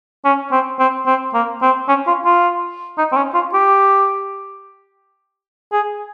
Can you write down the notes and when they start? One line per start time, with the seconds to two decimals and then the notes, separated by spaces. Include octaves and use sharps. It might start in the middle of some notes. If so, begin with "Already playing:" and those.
0.25 C#4
0.52 C4
0.79 C4
1.06 C4
1.34 A#3
1.62 C4
1.88 C#4
2.07 F4
2.25 F4
2.98 D#4
3.12 C4
3.17 C#4
3.34 F4
3.54 G4
5.73 G#4